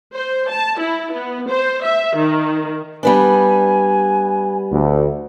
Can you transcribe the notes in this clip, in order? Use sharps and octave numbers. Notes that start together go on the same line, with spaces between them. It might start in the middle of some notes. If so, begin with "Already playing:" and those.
C5
A5
E4
B3
C5
E5
D#3
G3 B3 D4 G#5
D2